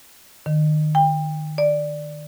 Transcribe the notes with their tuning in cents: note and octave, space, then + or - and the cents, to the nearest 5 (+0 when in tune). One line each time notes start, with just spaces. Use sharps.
D#3 -30
G5 +30
D5 +0